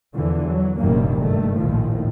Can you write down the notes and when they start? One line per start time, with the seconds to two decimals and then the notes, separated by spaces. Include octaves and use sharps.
0.14 E2 D3 E3 F3
0.47 F#3
0.79 F1 A#1 F#2 D#3 G3 A#3
1.21 G2 D#3 A3
1.58 A#1 D#2 A2 D#3 F3